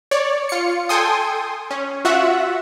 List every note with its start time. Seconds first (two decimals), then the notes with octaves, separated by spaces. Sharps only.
0.11 C#5 D5
0.49 F4 C#7
0.89 A4 G5 G#5 C6 D#6
1.71 C#4
2.05 F4 F#4 E5 F#5